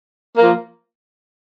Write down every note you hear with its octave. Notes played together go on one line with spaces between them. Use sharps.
F3 A#3